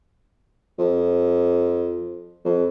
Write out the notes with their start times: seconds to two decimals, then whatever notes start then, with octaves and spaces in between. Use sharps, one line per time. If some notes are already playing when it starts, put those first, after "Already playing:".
0.79 F2
2.45 F2